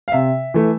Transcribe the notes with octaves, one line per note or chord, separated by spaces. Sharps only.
F5
C3 E5
E3 A3